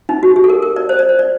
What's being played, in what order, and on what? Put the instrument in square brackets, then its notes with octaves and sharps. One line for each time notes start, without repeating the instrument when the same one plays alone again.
[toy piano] D#4
F#4
G4
A4
A#4
A#4
D5
C5
D5
C5
D5